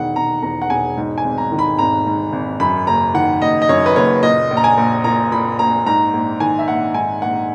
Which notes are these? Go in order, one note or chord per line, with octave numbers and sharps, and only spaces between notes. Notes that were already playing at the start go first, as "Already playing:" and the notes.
Already playing: E1 D#3 F#5
E1 A#5
E2 A#5
F#5
E1 G#5
G#2
G#5
G#1
A#5
D#3
B5
G#1 A#5
G#2
G#1
F#2 B5
F#1 A#5
D#3 F#5
F#1 D#5
D#5
F#2 C#5
B4
F#1 C#5
A#2 D#5
A#1
A#5
G#5
A#1
A#2 A#5
A#2 B5
A#1 A#5
G#2 A#5
A#1
D#3 G#5
E5
A#1 F#5
G#2 G#5
A#1 F#5